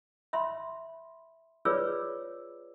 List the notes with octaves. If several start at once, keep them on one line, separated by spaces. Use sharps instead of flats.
E5 B5 C6
F4 G#4 B4 C#5 D5 E6